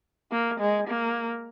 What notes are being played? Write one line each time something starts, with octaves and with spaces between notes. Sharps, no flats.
A#3
G#3
A#3